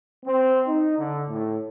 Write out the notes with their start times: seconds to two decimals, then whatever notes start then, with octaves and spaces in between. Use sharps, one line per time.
0.25 C4
0.66 D#4
0.97 D3
1.29 A2